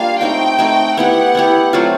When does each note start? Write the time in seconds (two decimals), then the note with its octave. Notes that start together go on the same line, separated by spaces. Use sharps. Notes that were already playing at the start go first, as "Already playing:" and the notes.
Already playing: G3 A#3 D4 F4 F5
0.20 A3 C4 D#4 F#4 G5
0.59 A3 C4 D#4 F#4
0.97 B3 E4 G4 F#5
1.35 B3 E4 G4
1.73 F#3 A3 C4 F4